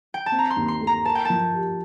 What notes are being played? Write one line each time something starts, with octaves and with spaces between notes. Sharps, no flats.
G5
A5
C4
A#5
C6
D#2
C6
A3
A#5
A#4 A5
G5
F3 A5
G4